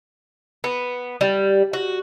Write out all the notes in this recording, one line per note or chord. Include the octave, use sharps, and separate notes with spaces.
B3
G3
F#4